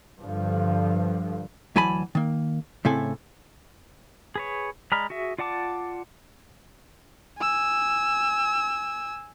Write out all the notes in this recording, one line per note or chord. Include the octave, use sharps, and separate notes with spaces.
G2 D3 F3
D2 E3 F#3 G#5 A5 B5
D#3 A#3
A2 C#3 C4 E4 A4 G#5
G#4 B4 C#5
G#3 D5 A#5 B5 F6
F#4 G#4 E5
F4 D5 F#5 A5 D6
G#5 E6